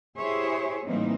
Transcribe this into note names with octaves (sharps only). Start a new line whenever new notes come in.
E4 G4 G#4 C5 C#5 E5
A2 E3 G3 A#3 C4 D#4